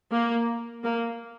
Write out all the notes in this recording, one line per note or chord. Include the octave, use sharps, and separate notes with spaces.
A#3
A#3